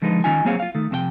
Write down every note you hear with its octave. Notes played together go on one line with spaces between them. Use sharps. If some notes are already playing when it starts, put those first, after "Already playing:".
D3 F3 G#3 D#4 B4
D#3 C#4 D#4 F4 G#5
F#3 A#3 C4 G#4 C#5 F5
F4 F5
D#3 A3
F2 C3 F4 G5